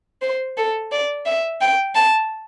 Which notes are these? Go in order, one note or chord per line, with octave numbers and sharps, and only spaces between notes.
C5
A4
D5
E5
G5
A5